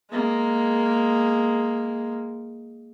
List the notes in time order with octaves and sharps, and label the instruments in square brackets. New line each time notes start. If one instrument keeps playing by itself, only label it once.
[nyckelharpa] G#3 A#3